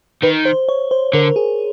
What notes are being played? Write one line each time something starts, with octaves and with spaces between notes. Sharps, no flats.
D#3 B4
C5
C#5
C5
D3 A#4
G#4